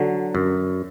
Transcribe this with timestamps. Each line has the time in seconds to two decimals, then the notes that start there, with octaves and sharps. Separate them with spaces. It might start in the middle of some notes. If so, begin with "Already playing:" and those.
Already playing: D3 F#3
0.35 F#2